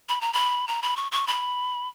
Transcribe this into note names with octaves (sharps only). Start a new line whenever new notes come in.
B5
A#5
B5
A#5
B5
C#6
C#6
B5